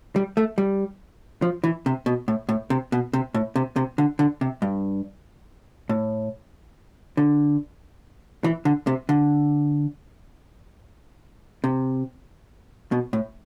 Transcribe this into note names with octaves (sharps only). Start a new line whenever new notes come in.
G3
A3
G3
F3
E3
C3
B2
A2
A2
C3
B2
C3
A2
C3
C3
D3
D3
C3
G2
A2
D3
E3
D3
C3
D3
C3
B2
A2